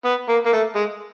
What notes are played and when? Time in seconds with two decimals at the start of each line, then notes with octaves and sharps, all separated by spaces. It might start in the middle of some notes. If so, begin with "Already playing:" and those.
0.05 B3
0.29 A#3
0.46 A#3
0.53 A3
0.75 G#3